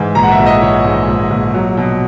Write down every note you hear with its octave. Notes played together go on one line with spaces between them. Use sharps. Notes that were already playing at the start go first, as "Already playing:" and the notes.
Already playing: G#2 E3
A#1 A#5
F#5
E5
A#1
D#5
E3 C#5
G#2
A#1
A#1
F#3
B2